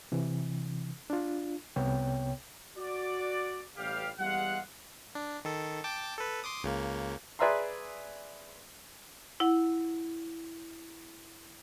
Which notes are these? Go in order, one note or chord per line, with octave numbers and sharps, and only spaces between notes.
C3 E3
D4 F4
C2 C3 B3 C#5 G5
F#4 D5
A1 G3 G4 F5
E2 G3 G#3 F5 F#5
D4
D#3 A4
G5 A5 D6
A4 B4
C6 D6 D#6
C#2 C#3 A#3
G#4 B4 D5 E5 A#5 C6
E4 F#5